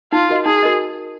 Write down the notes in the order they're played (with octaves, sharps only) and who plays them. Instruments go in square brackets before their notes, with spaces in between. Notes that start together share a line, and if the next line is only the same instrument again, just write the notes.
[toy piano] D#4 [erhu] F4
[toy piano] F#4 A#4 D#5
[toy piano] D#4 [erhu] G#4
[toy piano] F#4 A#4 D#5